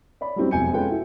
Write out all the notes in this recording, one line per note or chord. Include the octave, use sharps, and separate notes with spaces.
C#5 D5 B5
F#3 G3 C4 C#4
E1 F2 G#5 G6 C#7
G#3 C#4 F4 A4 B4 G5
E4 F#4